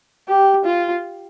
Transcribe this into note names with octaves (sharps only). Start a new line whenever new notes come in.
G4
F4